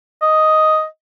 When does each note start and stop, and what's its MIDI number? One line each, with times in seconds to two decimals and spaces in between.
0.22 0.84 75